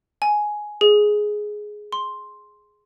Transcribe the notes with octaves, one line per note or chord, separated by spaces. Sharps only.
G#5
G#4
C6